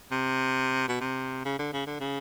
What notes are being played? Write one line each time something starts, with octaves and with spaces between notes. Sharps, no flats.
C3
B2
C3
C#3
D3
C#3
D3
C#3